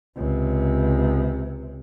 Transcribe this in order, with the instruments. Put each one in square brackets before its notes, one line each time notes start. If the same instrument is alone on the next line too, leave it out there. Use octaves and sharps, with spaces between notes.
[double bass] C#2 C3